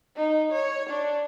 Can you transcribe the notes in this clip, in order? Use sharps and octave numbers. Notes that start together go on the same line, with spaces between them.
D#4
C#5
D4